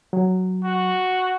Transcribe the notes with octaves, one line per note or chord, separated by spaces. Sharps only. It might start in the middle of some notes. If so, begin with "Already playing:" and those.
F#3
F#4